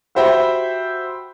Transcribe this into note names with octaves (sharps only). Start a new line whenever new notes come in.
F#4 G4 C5 E5 G5 B5